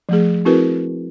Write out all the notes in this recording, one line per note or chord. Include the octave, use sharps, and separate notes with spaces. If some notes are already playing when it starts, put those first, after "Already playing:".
F3 A3 G#4
C4 E4 F#4 G#4 A#4 B4